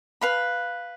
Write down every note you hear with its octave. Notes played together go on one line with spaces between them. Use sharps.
B4 F5 B5